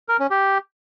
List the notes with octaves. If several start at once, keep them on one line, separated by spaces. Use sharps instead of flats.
A#4
C#4
G4